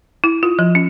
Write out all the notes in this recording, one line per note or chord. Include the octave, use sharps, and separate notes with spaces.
E4
F4
F3
C#4